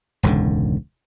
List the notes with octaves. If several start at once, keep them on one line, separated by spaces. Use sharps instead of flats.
E1 C#2 G#2 D3